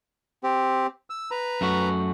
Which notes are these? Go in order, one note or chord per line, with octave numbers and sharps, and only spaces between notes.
C4 G4
E6
B4 A#5
F#2 A3 F#4